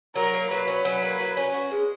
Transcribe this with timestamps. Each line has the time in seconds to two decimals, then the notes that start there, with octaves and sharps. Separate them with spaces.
0.15 F#3 A#4
0.34 A#3
0.51 F#3 B4
0.68 C#4
0.85 F#3
1.02 A#3
1.20 F#3
1.37 C#4
1.54 F#4
1.71 G#3